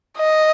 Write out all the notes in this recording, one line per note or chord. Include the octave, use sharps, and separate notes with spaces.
D#5